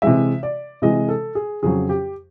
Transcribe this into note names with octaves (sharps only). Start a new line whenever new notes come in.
C3 E3 G#3 E5
D5
C3 E3 G#3 D#5
A4
G#4
F2 C#3 F#3 G#4
G4